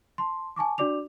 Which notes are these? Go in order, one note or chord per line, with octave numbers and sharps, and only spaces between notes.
A5 C6
G#5 A5 C#6 D6
D4 F#4 D5 D6 F7